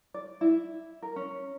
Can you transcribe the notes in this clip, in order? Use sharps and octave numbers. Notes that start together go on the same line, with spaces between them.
D5
E4
A#4
C#4